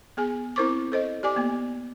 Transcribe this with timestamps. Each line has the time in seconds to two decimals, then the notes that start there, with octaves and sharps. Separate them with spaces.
0.17 B3 G#4 G#5
0.56 C4 E4 A#4 C5 C#6 D6
0.92 A4 C5 D#5
1.23 G4 D5 G#5 D6
1.36 A#3 B3